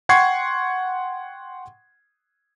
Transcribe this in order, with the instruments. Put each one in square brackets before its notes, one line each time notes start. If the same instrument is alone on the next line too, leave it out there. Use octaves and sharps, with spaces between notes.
[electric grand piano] F#5 G5 C6 C#6 G#6 C7